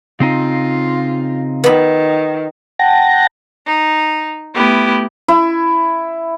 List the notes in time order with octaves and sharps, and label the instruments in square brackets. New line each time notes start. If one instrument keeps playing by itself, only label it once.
[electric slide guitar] C#3 C4 D#4 [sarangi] F4
[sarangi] D#3 [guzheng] B3 B5
[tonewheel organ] F#5 G5 A5 A#6
[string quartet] D#4
A3 B3 E4 G4
[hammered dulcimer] E4